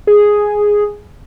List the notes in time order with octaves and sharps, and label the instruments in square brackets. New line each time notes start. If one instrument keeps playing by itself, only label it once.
[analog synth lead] G#4